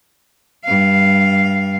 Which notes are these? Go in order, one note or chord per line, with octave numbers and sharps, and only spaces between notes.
G2 F5